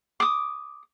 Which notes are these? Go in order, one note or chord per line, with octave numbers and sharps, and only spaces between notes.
D6 D#6